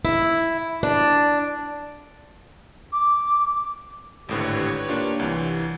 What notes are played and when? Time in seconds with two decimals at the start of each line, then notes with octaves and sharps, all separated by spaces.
0.05 E4
0.83 D4
2.93 D6
4.29 G#1 A2 D3 G4 B4 C#5
4.89 A#3 D4 F4
5.19 C2 E3